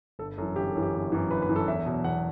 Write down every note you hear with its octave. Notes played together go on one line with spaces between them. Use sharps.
G1 A4
F#2 E3 A4
G1 G4
A4
F#2 E3
G4
G1
F#2 E3
G1 B4
B4
F#2 E3
A4
E2 E5
B2 F#3
E2 F#5